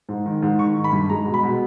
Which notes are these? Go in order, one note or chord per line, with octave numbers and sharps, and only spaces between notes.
G#2
D#3
G#2
D#3 C#6
D#3
B5
G2
G#3 A#5
B2
B5
B2